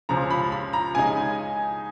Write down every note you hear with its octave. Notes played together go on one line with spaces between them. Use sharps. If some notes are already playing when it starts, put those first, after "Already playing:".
C#2 C#3 F3 A#5
B5
B5
A#5
C#3 G#3 D#4 G#5